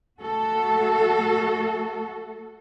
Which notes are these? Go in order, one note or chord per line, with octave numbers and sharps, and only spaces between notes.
A3 F#4 A4